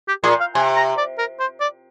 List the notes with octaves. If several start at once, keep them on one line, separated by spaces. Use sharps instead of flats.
G4
A#2 G#4
F5
C3 G#5
A#5
D5
A#4
C5
D5